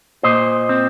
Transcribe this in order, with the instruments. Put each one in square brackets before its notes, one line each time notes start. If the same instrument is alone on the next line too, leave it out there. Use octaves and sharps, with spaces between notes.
[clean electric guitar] A#2 C5 D#5
C4